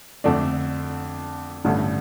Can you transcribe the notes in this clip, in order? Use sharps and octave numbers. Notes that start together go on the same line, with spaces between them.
F2 D3 A3 D4
A1 G2 D3 A3